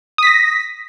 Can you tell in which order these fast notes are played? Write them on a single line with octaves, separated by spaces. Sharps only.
D#6 B6 A#6